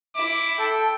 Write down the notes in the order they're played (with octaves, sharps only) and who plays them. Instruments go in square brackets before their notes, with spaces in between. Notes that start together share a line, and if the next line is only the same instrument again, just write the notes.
[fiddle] E4 [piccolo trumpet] D6
[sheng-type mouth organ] A4 [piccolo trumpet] G5